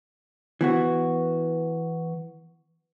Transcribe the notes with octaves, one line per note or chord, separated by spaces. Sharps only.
E3 B3 F#4